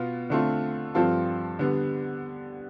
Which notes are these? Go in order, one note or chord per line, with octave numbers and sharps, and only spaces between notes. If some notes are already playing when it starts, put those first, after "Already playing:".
Already playing: B2 B3 F4
D3 A3 C4 F4
G2 F3 C4 F4 A4
D3 G3 B3